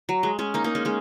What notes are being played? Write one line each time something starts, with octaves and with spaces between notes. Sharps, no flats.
F#3
G#3
G#3 C#4
A#3 D#4
A#3 D#4
G#3 C#4
G#3 C#4